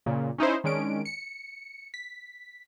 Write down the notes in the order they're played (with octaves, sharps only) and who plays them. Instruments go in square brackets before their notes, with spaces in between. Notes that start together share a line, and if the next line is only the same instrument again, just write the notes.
[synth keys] A#2 C#3
C#4 D#4 E4 C5
D#3 G#3 C#4 D4 D7
C#7
B6